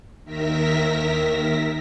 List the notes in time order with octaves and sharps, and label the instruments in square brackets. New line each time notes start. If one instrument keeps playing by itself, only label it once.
[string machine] D#2 D#3 A#4 E5 A#6 B6